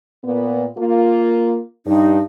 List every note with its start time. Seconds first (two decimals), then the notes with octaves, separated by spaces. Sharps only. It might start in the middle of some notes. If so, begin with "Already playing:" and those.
0.25 A#2 B3
0.78 A#3 F4
1.86 G2 D#4